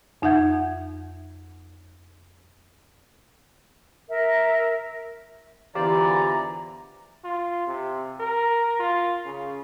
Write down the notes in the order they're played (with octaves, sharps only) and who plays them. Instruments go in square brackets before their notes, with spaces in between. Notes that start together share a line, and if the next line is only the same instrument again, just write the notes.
[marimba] F2 D#4 E5 F#5 G6 G#6
[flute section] A#4 E5
[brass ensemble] E2 D3 E3 [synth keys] F4 G4 C5 [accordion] D5 [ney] A#5
[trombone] F4
C3
A#4
F4
C#3